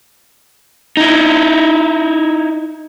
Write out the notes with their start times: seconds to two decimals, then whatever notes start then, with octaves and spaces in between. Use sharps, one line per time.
0.97 D#4 E4